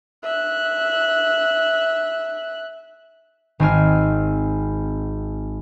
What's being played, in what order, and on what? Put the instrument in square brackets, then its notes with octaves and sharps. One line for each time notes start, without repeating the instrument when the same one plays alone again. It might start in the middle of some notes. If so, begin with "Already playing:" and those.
[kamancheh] E5 F#6
[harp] G#1 C4 G#5 F6